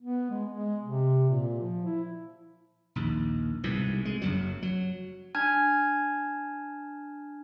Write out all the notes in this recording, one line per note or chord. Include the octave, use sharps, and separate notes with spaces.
B3
G#3
G#3
C3
A#2
F3
E4
A#1 D#2
C2 G#2 B2
G#3
F#1 F#2 F#3
F#3
D4 G#5 A5 F6 G#6